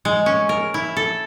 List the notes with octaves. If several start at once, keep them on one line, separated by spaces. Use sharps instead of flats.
G#3
C#4
A#4
E4
A4